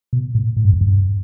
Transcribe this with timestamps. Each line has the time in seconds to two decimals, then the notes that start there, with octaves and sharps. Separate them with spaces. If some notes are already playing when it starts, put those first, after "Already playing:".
0.13 B2
0.35 A2
0.57 A2
0.65 G2
0.73 F2
0.81 G2